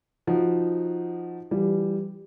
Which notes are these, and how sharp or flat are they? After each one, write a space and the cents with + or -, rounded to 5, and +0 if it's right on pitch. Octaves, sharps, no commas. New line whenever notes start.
F3 +0 D#4 +0 F#4 +0
E3 +20 G3 +0 F4 +40